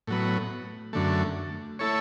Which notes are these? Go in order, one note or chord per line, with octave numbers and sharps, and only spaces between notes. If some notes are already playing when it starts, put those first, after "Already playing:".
A2 F#3 B3
F#2 D3 A3
A3 E4 A4 C#5